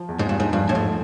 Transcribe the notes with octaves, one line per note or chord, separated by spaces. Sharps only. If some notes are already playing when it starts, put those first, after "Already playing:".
Already playing: F3
E2
G#2
G2 F3
G#2
G2 F3
A2
G#2 A3